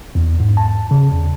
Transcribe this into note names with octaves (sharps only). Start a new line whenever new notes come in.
E2
G#2
A5
C#3
E2